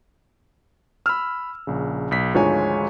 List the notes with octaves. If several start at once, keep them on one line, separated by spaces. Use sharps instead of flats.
B5 E6 F6
A#1 C#3
B1 B6
G#1 D2 F3 G#3 C#5 G#5